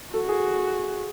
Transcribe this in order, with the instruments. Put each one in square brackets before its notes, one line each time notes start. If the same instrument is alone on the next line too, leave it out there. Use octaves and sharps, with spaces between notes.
[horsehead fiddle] F#4 [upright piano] A4
[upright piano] G#4